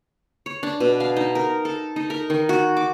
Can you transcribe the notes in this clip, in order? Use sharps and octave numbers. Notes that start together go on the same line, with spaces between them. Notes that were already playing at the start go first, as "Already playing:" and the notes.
C#5
D4
B2
F5
D#4
A#4
A4
D#4
A#4
D#3
F#4
D6